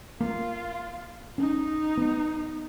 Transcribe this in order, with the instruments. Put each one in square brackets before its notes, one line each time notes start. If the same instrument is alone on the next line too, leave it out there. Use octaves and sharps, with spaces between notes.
[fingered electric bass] A#3 [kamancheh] F4
[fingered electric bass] C#4 [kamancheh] D#4
[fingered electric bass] B3